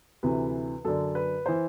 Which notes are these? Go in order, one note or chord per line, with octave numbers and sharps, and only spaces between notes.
D2 C3 E3 B4
F#2 D3 A4
B4
E3 C5